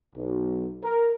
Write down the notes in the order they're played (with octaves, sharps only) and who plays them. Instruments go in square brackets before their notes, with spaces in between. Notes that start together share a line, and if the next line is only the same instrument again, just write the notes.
[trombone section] B1
A#4